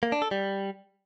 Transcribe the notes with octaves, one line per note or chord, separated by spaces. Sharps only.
A#3
D4
A4
G3